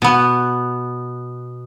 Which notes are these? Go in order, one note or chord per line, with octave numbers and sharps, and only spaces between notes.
B2 B3